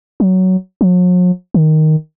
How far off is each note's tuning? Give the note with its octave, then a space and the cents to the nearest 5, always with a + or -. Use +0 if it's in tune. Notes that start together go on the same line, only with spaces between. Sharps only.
F#3 +10
F#3 -45
D#3 +0